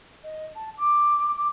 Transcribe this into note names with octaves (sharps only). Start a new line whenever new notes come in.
D#5
A5
D6